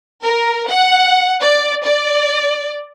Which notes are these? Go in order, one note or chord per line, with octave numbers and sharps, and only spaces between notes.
A#4
F#5
D5
D5